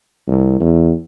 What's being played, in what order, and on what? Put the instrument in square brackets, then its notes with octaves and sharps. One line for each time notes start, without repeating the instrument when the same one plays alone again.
[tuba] C2
E2